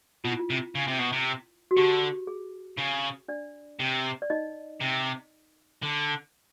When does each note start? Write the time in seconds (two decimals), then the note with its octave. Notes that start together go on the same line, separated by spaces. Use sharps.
0.24 B2 F4
0.32 E4
0.39 F4
0.50 C3
0.75 C#3
0.87 C3
0.99 B2
1.12 C3
1.71 F#4
1.77 D3 G4
2.27 G#4
2.77 C#3
3.28 D4 D5
3.80 C3
4.22 D5
4.30 D#4 D#5
4.80 C3
5.82 D3